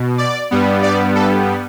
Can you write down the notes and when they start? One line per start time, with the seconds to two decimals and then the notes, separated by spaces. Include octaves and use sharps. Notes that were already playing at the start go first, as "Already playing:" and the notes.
Already playing: B2
0.18 D5
0.51 G2 G3 B3
0.83 D5
1.15 A4